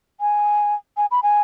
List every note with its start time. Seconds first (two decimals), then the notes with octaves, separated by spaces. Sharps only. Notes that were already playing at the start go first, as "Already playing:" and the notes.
0.20 G#5
0.97 G#5
1.11 B5
1.23 G#5